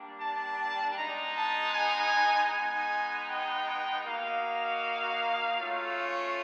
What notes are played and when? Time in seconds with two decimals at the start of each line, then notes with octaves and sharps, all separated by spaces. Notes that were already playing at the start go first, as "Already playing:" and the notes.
Already playing: G3 A#3 D4
0.20 A5
0.97 G#3 B3 D#4 A#5
1.36 A5
1.74 G#5
2.50 G#3 B3 D#4 G#5
3.28 G5
4.04 A#3 D#4 F#4 F5
5.59 A3 C#4 F4